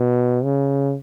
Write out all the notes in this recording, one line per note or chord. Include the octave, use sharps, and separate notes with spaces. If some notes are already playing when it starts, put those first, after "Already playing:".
Already playing: B2
C#3